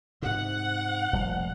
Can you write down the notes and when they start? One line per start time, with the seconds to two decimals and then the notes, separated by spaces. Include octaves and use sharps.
0.22 G#2 C3 F#5
1.13 F1 A#2 G3